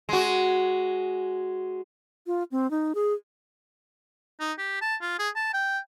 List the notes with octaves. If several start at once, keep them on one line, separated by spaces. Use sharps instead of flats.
G#3 F#4
F4
C4
D#4
G#4
D#4
G4
A5
F4
G#4
A5
G5